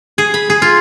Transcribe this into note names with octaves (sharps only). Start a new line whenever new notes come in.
G#4
B5
G#4
F4